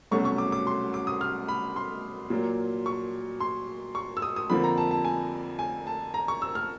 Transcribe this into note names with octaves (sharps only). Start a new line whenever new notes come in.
C2 B2 F#3 A3 C#4 C#6
C#6
D6
D6
C6
D6
D#6
F6
B5
C6
A#2 F#3 A#3
C#6
C6
C#6
E6
D#6
D#6
F2 D3 F3 A#3 B5
A#5
A5
A5
G#5
G#5
A5
A#5
C#6
E6
F6